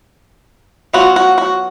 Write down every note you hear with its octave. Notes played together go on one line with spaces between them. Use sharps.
F#3 B3 F4 F#4
F#4
F#4